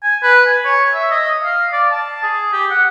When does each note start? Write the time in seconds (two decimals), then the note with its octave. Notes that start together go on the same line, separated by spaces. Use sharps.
0.04 G#5
0.23 B4
0.47 G#5
0.65 C#5
0.94 E5
1.11 D#5
1.44 F5
1.73 D5
1.91 A5
2.23 G#4
2.53 G4
2.71 F#5